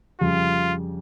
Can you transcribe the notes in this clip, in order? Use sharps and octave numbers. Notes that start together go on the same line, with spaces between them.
F2 C#3 G3 F4